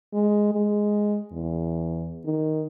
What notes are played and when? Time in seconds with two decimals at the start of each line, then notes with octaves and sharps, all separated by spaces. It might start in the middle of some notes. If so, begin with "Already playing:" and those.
0.14 G#3
0.53 G#3
1.32 E2
2.25 D#3